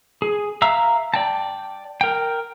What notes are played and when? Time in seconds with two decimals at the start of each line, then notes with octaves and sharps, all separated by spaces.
0.22 G#4
0.62 E5 F5 A#5 E6
1.14 D5 G5 A5
2.01 A#4 G5